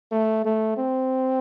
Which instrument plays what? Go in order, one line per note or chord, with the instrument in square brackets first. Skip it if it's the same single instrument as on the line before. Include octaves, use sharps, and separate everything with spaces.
[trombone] A3
A3
C4